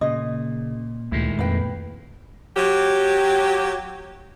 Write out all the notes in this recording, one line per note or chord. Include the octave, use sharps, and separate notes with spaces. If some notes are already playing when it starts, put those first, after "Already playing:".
A#2 C#3 D#5
D2 A#2 D#3 G#3 A3 E4
F2 B4 G5
F#3 G4